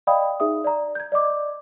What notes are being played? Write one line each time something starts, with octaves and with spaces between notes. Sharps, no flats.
D5 D#5 F5 G5 B5 D#6
D#4 G#4 E5 D#6
D5 A#5
G6 G#6
D5 D#5 D6